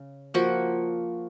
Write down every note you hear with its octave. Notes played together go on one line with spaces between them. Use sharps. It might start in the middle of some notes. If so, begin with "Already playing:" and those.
Already playing: C#3
F3 A#3 F#4